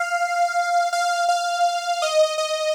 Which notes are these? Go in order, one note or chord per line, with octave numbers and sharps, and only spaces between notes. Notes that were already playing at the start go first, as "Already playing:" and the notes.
Already playing: F5
F5
F5
D#5
D#5